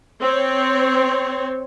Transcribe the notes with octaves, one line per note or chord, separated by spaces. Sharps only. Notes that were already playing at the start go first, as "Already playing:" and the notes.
C4 C#5